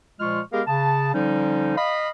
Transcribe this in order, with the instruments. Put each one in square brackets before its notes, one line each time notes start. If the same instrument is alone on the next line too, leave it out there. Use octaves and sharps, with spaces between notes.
[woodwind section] A#2 F3 G#3 F4 C#6 F6
G#3 B3 G4 G#4 A#4 F5
C#3 A5
D3 F3 G3 C#4 D#4
D#5 F5 B5